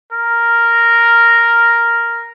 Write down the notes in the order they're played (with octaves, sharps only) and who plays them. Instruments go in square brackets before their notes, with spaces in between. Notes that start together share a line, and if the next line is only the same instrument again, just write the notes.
[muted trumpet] A#4